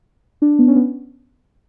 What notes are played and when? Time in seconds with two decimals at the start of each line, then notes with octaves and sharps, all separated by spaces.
0.42 D4
0.59 B3
0.68 C#4
0.76 B3